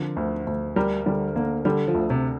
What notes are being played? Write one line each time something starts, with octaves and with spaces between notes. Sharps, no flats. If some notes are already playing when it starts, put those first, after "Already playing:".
Already playing: D3 F3 C4 A#4
D2
D2
G3 A#4
D3 G3
D3 A#3
D3 G3
F3
D2
C3